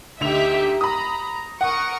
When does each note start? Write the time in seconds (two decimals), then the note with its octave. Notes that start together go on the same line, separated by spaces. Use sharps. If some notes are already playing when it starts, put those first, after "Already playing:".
0.21 D2 D#4 G4 E5 F7
0.81 A#5 B5 D#6
1.61 A#4 F#5 C#6 D#6